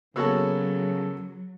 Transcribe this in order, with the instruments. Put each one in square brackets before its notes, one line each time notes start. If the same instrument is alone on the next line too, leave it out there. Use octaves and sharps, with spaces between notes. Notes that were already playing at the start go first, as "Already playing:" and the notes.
[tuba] C#3 [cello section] F#3 [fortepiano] A#3 B3 F#4 [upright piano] A4 C#5 E6